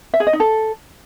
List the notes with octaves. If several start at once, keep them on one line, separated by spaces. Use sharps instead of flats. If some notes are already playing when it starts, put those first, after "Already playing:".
E5
G#4
D#5
D#4
A4